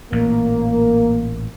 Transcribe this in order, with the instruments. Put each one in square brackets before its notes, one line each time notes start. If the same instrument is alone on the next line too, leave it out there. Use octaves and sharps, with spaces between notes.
[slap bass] A1 A#2 [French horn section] A#3